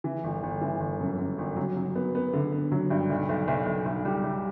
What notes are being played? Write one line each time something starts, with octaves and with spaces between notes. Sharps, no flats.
E3
G1
G1
E3
G1
F#2
F#2
G1
F#3
F#3
B3
B3
D3
B3
F#3
G2
B1
B1
B1
B1
B1
G3
G3